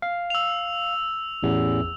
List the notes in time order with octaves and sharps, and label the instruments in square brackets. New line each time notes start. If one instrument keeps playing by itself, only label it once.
[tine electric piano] F5
[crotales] E6 F7
[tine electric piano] A1 E2